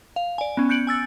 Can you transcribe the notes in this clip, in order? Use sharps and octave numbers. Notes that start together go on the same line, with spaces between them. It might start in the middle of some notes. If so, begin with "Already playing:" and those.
F5
D5 G#5
B3 C#4
F#6 G6 C#7 D7 F#7
G#5 E6 A6